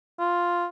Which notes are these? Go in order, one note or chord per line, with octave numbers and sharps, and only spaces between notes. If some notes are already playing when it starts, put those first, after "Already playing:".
F4